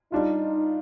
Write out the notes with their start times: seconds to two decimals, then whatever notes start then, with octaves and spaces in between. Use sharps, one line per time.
0.12 G3 D4 D#4 F4